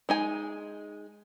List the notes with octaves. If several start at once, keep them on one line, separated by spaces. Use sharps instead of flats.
G#3 D#4 G#5